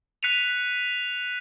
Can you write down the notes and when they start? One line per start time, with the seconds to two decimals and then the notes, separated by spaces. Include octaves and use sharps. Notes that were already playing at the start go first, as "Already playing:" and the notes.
0.23 F#6 B6 C#7 D#7 F7